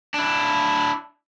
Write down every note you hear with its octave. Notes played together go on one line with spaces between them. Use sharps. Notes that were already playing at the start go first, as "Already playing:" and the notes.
D4 E4